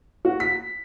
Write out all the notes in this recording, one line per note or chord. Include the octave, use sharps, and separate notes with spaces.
F#4
B6